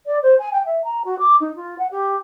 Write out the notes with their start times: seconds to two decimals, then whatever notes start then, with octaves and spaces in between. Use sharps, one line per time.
0.06 D5
0.22 C5
0.39 G#5
0.52 G5
0.66 E5
0.84 A#5
1.05 F#4
1.19 D6
1.40 D#4
1.55 F4
1.78 F#5
1.91 G4